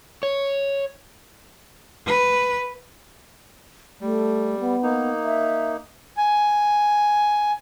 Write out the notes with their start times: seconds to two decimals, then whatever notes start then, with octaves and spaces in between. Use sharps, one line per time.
0.23 C#5
2.06 B4
4.01 G3 A3
4.60 B3
4.83 A#3 D#4
5.24 E5
6.17 G#5